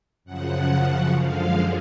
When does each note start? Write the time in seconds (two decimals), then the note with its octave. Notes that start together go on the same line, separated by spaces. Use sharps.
0.24 F#2 C#3 F3 F#5
1.17 F#2 D3 F3 G#3 F5